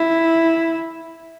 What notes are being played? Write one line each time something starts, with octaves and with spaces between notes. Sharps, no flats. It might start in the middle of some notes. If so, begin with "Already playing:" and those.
Already playing: E4